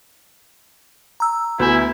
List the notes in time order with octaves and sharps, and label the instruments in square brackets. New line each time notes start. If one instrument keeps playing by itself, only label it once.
[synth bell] A#5 E6
[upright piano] D2 G6 [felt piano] B3 E5 G#5 [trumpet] E4